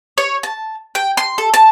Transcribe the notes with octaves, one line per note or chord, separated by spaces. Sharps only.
C#5
A5
G5
C6
A4
A5